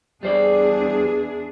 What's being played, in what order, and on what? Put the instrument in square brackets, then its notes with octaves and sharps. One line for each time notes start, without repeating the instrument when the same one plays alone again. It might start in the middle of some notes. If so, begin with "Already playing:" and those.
[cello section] E2 D4 G#4 [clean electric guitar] G3 C5 D5